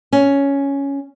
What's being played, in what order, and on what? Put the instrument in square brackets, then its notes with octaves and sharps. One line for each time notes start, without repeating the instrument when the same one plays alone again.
[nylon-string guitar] C#4